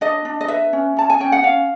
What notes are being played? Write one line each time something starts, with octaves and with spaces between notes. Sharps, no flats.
D4 D#5
D4
D#5
B4 E5
C#4
C#4 A5
G#5
C#4 G5
F#5
C#4 F5